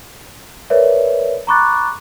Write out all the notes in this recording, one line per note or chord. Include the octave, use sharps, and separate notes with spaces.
A#4 B4 C#5 D5 E5
A#5 B5 C#6 D6 F#6 A6